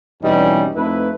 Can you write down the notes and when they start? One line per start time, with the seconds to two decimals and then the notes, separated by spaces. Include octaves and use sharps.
0.22 G#1 E2 B2 G3 C#4 D#4
0.75 F2 A3 D#4 E4 B4